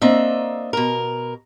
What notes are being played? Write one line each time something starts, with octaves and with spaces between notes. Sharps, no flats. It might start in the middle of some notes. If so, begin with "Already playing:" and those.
A#3 C4 D4 D#5 E5
B2 A#4